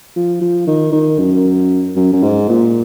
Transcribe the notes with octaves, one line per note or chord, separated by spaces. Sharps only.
F3
F3
D#3
D#3
F#2
F#2
F#2
G#2
A#2